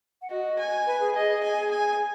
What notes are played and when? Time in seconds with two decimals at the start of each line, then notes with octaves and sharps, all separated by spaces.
0.22 F#5
0.30 F#4 D#5
0.58 G#5
0.87 B4
1.00 G#4
1.14 G#4 D#5
1.43 G#5
1.71 G#5